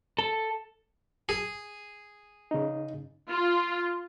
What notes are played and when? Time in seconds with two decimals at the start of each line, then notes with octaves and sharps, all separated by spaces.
0.18 A4
1.29 G#4
2.51 C#3 D#4
3.29 F4